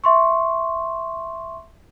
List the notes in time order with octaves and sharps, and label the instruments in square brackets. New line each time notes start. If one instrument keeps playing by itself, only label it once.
[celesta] E5 C6 C#6